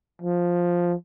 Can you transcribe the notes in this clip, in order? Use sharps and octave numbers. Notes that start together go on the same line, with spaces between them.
F3